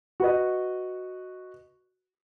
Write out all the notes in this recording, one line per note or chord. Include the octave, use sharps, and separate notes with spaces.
F#4 B4 D#5